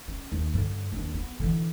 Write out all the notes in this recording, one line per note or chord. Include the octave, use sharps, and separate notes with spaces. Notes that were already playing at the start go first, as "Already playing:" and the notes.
C#4
D#2
G2 D3
D#2 D4
B3
D3 E3